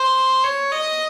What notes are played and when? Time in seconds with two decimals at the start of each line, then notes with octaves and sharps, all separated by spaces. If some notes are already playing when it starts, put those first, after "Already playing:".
Already playing: C5
0.44 C#5
0.72 D#5